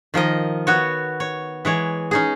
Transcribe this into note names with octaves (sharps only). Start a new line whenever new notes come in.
D#3 F3 A#4 D#5
B3 F#4 C#5
C#5
E3 G#3 C#5
C#4 D#4 G#4